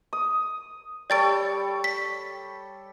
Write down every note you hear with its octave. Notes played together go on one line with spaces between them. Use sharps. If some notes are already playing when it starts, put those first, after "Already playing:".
D#6
G3 A4 C#5 D5 A6 D7
B6